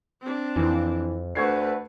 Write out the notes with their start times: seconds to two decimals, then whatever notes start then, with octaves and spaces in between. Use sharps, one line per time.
0.21 C4 D4
0.56 F2 E3
1.35 D2 D3 A3 B4 C#6 G#6 C7